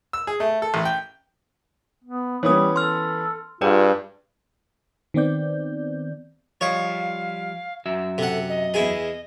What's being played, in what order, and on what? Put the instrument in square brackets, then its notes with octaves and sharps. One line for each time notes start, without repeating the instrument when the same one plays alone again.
[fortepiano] E6
G#4
A3
A4
A1
G5
[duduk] B3
[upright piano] E3 B3 C#4 [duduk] G3 [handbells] C#5 D#6
[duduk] A4 [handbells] C6 F6
[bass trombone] G2 [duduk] F4 [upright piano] G#4 F#5 [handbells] B4 D5
[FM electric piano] D#3 B3 C4 D5 G6
[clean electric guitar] F3 G3 D#5 [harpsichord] C#5 [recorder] F5
[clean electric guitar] F#2 F#4 E5
[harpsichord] C3 F#5 [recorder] A4
[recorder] D#5
[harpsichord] E2 E4 G#4